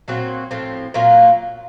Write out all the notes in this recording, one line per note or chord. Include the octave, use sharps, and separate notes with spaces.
A#2 F#3 C4 F#4
A2 F3 C4
A#2 F#3 A#3 F4